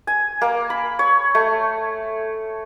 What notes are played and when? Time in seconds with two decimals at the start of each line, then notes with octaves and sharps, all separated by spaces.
0.07 G#5
0.41 A#3
0.70 B5
0.99 C#5
1.35 A3